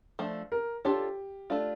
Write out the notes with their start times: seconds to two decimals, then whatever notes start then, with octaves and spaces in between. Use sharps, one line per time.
0.19 F3 A3 D4
0.52 A#4
0.85 D4 F4 G4 A4 C#5
1.50 A3 D4 F4